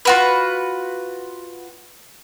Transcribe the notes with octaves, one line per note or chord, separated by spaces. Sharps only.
F4 F#4 B4